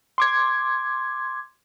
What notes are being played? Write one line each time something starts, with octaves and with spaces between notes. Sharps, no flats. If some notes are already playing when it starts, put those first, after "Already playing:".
C6 D6 G#6